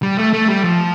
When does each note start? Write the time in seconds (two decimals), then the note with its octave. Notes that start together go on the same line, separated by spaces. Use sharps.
0.03 G3
0.17 A3
0.33 A3
0.49 G3
0.64 F3